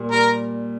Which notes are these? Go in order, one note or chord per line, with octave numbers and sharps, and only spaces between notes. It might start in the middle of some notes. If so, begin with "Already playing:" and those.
Already playing: A#2 G3
G3 A#4